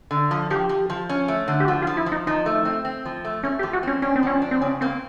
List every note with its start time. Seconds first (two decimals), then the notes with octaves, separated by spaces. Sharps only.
0.11 D3
0.31 F3
0.50 F3 G4
0.69 F3
0.90 F3
1.09 C#4
1.28 A3
1.48 D3
1.60 G4
1.67 F3 F#4
1.82 F4
1.87 F3
1.97 E4
2.06 F3
2.12 D#4
2.27 F3 D#4
2.46 A3
2.65 C4
2.85 C4
3.05 F3
3.25 A3
3.43 A3 C#4
3.59 G4
3.63 F3
3.73 F#4
3.83 C4 C#4
4.02 C#4 D4
4.16 C4
4.23 F3 C#4
4.42 D4
4.51 C4
4.61 C#3 C#4
4.81 A#3 C4